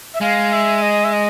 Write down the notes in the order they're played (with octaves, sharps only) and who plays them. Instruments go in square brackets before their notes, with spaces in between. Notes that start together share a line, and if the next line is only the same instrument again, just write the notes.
[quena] E5
[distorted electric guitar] G#3 [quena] F5
[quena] E5
D#5
E5
D#5